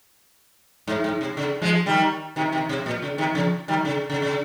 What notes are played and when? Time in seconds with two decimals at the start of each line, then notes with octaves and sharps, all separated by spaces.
0.87 G#2
1.04 G#2
1.21 C3
1.37 C#3
1.62 F3 G#3
1.86 D#3 G3
2.36 C3 D#3
2.52 C3 D#3
2.69 C3
2.86 A#2
3.02 C#3
3.18 C3 D#3
3.35 C#3 F3
3.68 D#3 G3
3.85 C#3
4.10 C#3
4.22 C#3